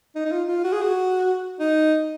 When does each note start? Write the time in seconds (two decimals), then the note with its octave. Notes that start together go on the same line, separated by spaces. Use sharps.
0.15 D#4
0.26 D#4
0.32 F4
0.48 F4
0.64 F#4
0.73 G#4
0.81 F#4
1.60 D#4